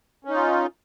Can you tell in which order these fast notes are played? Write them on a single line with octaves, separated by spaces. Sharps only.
C#4 D#4 F4